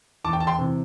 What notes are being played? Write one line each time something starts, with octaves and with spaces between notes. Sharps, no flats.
E2 A5 D6
G5
A5
G5 C6
C3 E3